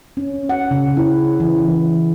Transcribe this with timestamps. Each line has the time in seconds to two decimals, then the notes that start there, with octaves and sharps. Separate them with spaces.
0.17 C#4
0.49 F#5
0.71 C#3
0.97 E4
1.40 E3
1.68 E3